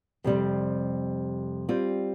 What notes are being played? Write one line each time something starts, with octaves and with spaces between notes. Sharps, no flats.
F2 C3 G3 C4
G3 C4 F4